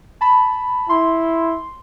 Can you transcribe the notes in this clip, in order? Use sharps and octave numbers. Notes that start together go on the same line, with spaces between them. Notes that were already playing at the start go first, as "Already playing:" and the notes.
A5 B5
E4 C6